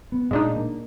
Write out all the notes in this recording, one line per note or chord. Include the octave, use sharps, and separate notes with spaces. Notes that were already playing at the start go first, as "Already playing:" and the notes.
B3
A#2 G#3 D4 D#4
A#3